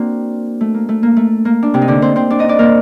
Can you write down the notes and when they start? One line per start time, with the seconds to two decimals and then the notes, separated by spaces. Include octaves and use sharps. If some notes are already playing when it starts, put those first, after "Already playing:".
Already playing: A#3 C4 D4 F#4
0.61 A3
0.74 A#3
0.89 A3
1.03 A#3
1.16 A3
1.45 A#3
1.63 D4
1.74 C3 C4
1.82 D#4
1.88 D3 D4
2.02 C4 C5
2.16 C4 C5
2.30 D4 D5
2.39 D#4 D#5
2.48 D4 D5
2.59 A#3 A#4